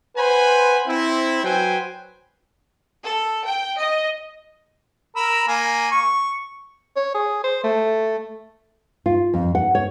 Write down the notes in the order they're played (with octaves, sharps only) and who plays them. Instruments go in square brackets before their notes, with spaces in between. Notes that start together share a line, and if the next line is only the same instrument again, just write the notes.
[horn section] B4 C5 F#5 G#5 B5
C4 E4
F#3 B4 C5 G5 G#5
[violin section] A4
G5
D#5
[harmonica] A#4 B5 E6
A#3 G#5
C#6
[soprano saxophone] C#5
G#4
C5
A3
[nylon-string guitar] F4
F2
F#5
C#5